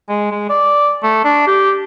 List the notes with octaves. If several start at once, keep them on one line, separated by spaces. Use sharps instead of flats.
G#3
G#3
D5
A3
D4
G4